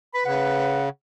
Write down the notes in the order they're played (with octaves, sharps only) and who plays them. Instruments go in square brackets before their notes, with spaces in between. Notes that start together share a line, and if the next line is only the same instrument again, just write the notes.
[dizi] B4 [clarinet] B5
[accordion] C#3 [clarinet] F#5